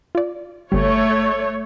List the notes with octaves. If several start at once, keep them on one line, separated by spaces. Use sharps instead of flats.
F4 D5
G1 G3 A3 C#5